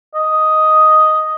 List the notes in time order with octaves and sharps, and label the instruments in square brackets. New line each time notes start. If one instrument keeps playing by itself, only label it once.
[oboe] D#5